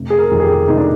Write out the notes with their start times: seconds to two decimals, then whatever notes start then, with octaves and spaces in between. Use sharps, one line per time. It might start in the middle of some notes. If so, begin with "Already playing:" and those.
Already playing: F1
0.10 G#4
0.18 A#4
0.31 F2 C3 D#3
0.40 G#4
0.44 G4
0.68 F1 D#4
0.77 D4